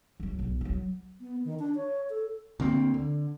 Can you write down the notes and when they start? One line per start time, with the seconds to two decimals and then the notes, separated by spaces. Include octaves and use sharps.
0.20 D#3 F#3
0.39 B1
0.61 F3 F#3
1.20 B3
1.45 D#3
1.59 D4
1.76 C#5
2.10 A4
2.60 D2 D3 A#3 C4
2.94 D3